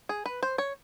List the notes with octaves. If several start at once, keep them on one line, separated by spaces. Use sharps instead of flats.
G#4
B4
C5
C#5